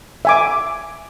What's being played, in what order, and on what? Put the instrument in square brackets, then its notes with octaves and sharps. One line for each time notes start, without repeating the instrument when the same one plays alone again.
[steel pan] E5 G#5 D6